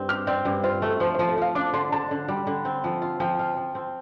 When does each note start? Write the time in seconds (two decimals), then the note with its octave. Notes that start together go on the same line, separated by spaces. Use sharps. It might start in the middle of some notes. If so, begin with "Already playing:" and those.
Already playing: G2 C4
0.09 G4 F6
0.27 C4 D5
0.45 G2 D5
0.64 F4 C5
0.82 A3 A4
1.00 F3 C5
1.15 C5
1.19 F3
1.28 A4
1.38 F3 F5
1.55 D4 D6
1.73 D3 C6
1.92 D3 A5
2.11 D3
2.28 G3
2.47 D3
2.65 C4
2.84 F3
3.02 F4
3.20 F3 G5
3.39 F4
3.57 F3
3.75 C4